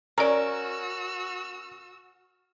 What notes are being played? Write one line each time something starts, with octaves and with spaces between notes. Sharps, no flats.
C#4 F#4 A#4 D5 A#5 E6